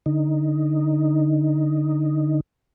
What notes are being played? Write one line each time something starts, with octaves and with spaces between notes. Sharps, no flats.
D3 D#4